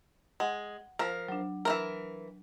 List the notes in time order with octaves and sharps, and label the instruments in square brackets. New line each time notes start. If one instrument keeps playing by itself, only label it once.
[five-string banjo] G#3 [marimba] F#5
[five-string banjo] F3 A#4
[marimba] F#3 D4
[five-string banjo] E3 F3 A#4